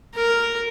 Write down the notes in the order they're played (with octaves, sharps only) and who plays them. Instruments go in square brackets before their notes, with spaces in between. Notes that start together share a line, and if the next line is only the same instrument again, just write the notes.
[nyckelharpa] A#4